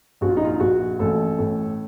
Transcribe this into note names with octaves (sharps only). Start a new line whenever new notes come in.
A#1 F#4
F4
D#4
F4
A#1 F#4
A1 A4
A2